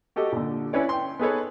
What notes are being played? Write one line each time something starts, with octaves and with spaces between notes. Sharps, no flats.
F#4 G4 A4 D#5
A#2 D3
C#4 E4 B4 C#5 D5
G5 C6
B3 D#4 G#4 A4 B4 C#5